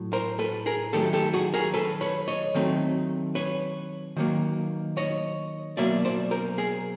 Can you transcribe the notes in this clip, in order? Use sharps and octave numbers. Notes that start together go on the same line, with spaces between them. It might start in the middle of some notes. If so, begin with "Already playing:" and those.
Already playing: A2 F#3
A#4 C5
A4 B4
G#4 A#4
D#3 F#3 A3 G4 A4
G4 A4
F#4 G#4
G#4 A#4
A4 B4
B4 C#5
C#5 D#5
D#3 F#3 A3 C4
B4 C#5
D#3 F#3 A#3
C#5 D#5
B2 F#3 A#3 D5 E5
C5 D5
A#4 C5
G#4 A#4